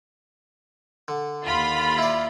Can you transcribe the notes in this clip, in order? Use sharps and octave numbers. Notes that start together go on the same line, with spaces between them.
D3
D#2 F4 B5
E4 D5